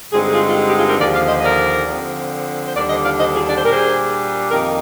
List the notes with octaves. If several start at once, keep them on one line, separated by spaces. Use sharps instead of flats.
G2 D3 G#3 C4 D#4 F4 G#4
F4 G#4
F4
G4
G4
F4 G#4
G4 A#4
D#2 D3 F3 A#4 D5
D5 F5
C5 D#5
D#5
A#4 D5
D3 F3 C4
C5
D#2 D3 G3 D4 A#4 D5
C5 D#5
D5 F5
C5 D#5
F4 G#4
D5
C5
A#2 G3 D4 A#4
G#4 C5
F2 D#3 A#3 D#4 G4 A#4